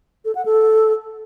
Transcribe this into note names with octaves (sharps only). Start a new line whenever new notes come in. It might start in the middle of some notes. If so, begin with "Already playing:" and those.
A4
F#5
A4